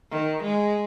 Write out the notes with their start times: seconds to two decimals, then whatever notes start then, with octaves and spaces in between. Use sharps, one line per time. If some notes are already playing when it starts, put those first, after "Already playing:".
0.11 D#3
0.43 G#3